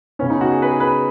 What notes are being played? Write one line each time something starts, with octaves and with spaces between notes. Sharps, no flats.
C#3 B3 C#4
D#4
F#4
G#4
B4
G#4
B4